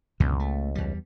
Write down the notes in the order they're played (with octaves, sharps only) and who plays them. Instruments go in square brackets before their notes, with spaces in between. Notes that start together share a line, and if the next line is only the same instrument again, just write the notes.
[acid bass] C#2 [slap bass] F#2 B2 D3
[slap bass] A3
E2 G3